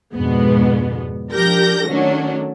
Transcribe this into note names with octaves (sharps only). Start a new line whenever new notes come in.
F2 G#2 B2 D3 G#3 B3
F3 D4 G4 A#4 G6 A#6
D#3 F#3 A3 C#4 D4